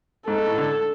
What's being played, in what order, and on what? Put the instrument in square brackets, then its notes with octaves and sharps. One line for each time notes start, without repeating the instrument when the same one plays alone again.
[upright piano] G#2 [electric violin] A4
[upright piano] G#2
A2
D3